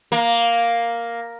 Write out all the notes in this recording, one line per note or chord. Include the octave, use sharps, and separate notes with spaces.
A#3